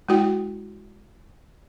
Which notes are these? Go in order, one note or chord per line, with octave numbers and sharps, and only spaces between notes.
G#3 E4 F#4 G5